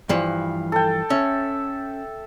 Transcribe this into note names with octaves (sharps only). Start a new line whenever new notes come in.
G2 E3 F3
A4 G5
C#4 E5